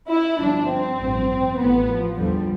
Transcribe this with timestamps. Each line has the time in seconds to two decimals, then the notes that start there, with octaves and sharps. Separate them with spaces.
0.10 E4
0.39 G1 G2 F3 D4
0.69 C4
0.99 A1 G2 F3
1.58 A1 A2 F3 B3
1.87 F3
2.17 E2 D3 F3 G3